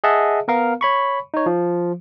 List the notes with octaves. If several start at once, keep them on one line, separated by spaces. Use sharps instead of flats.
G#4 D#5 E5 F#5 A5
B3 A#4 F5
C#5 B5 C#6
D#4 C#5
F3